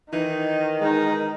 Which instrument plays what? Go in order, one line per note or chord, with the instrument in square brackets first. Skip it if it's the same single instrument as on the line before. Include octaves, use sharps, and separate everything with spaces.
[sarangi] D#3 [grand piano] E3 [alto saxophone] D#4
[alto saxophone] G#3 [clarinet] D#4